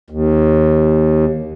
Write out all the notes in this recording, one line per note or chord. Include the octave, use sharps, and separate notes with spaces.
D#2